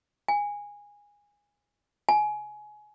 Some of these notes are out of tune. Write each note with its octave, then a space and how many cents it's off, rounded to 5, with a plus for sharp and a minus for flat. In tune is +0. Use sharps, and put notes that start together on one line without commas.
G#5 -15
G#5 +20